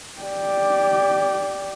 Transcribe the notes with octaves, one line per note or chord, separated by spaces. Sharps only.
G4 D5